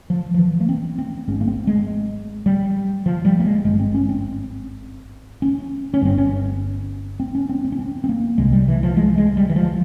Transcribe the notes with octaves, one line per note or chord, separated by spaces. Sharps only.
F3
F3
E3
A#3
C4
C4
G#1 G#2 C#4
A#3
C4
G#3
G3
F3
G3
A#3
G#3
G#1 G2 G#3
C4
C#4
C4
C#4
C#4
G1 G2 C4
C#4
C4
C#4
C4
C4
C#4
C4
C4
A#3
C2 C3 G#3
G3
E3
F3
G#3
G#3
G3
E3
F3